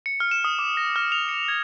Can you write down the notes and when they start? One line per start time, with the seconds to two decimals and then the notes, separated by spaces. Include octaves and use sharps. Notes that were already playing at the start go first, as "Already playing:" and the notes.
0.06 C#7
0.20 F6
0.31 E7
0.44 D#6
0.59 D6
0.77 A#6
0.96 F6
1.12 F7
1.29 C#7
1.48 G#6